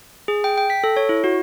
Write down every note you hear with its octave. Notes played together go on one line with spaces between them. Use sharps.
G#4
G5
G5
B6
A4
C#5
E4
F#4